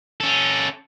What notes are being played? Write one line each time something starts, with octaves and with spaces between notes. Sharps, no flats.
C#4 A4